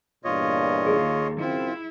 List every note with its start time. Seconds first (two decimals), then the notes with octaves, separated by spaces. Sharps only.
0.25 E2 G2 A#2 F4 C#5 D#5
0.87 D#2 G#4
1.40 F#2 C#3 C4 E4 F4